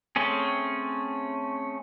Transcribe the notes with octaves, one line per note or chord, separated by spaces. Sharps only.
A3 C4 C#4 G#4